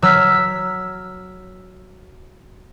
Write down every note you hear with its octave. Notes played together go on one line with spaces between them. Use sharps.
F#3 E6 F6 B6